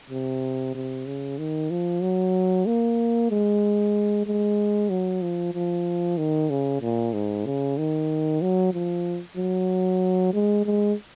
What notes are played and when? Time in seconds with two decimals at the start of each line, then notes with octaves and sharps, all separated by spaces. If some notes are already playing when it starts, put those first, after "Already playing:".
0.10 C3
0.75 C3
1.06 C#3
1.38 D#3
1.70 F3
2.02 F#3
2.66 A#3
3.30 G#3
4.26 G#3
4.90 F#3
5.22 F3
5.54 F3
6.18 D#3
6.50 C#3
6.81 A#2
7.13 G#2
7.45 C#3
7.78 D#3
8.42 F#3
8.73 F3
9.37 F#3
10.33 G#3
10.66 G#3